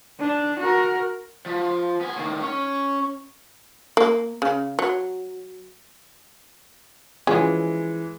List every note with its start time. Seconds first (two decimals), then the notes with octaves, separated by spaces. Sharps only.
0.19 D4
0.59 F#4 A#4
1.46 F3
2.01 B3 G#5
2.16 A2 D#3
2.42 C#4
3.97 A#3
4.42 C#3
4.79 F#3
7.27 E3 F3 G#3 C#4 G#4